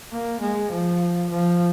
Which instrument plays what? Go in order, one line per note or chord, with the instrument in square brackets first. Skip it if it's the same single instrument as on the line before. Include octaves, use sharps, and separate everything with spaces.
[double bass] A#3
G#3
F3
F3